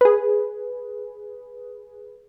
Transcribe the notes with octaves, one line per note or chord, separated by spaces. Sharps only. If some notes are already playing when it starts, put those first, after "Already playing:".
G#4 B4